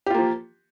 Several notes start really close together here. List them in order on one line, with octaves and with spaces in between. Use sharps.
G4 F4 A#3 F3